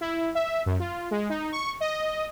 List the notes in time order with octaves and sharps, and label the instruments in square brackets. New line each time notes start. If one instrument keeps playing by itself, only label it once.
[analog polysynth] E4
E5
F#2
F4
G#3
D#4
C#6
D#5